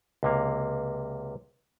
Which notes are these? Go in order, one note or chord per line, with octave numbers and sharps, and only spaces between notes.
C#2 C3 A#3